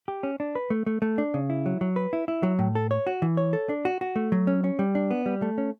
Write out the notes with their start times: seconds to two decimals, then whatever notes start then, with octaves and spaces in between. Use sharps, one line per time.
0.08 G4
0.23 C#4
0.40 D4
0.55 B4
0.70 A3
0.86 A3
1.02 A3
1.18 D4
1.34 C#3
1.50 E4
1.66 F#3
1.81 F#3
1.96 B4
2.13 E4
2.28 E4
2.43 F#3
2.59 A2
2.75 A4
2.91 C#5
3.07 F#4
3.22 E3
3.37 C#5
3.53 A4
3.69 D4
3.85 F#4
4.01 F#4
4.16 A3
4.32 F#3
4.47 C#4
4.64 C#4
4.79 G3
4.95 D4
5.11 B3
5.26 G3
5.42 A3
5.58 C#4